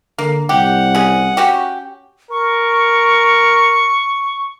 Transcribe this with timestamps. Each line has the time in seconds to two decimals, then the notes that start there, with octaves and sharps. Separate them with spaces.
0.18 D3 A#3
0.49 C2 G4 F#5
0.95 C#3 G#4
1.37 C#4 F#4 G4
2.31 A#4 C#6